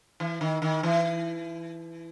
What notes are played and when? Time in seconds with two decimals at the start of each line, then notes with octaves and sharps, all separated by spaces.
0.20 E3
0.41 D#3
0.62 D#3
0.83 E3